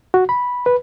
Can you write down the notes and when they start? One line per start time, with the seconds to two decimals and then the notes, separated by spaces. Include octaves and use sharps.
0.14 F#4
0.29 B5
0.66 B4